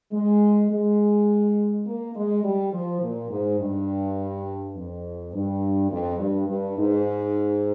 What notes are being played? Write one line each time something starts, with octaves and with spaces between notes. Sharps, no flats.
G#3
G#3
A#3
G#3
G3
F3
A#2
G#2
G2
F2
G2
F2
G2
G2
G#2